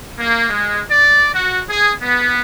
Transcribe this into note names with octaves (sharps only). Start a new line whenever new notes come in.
A#3
G#3
D5
F#4
G#4
B3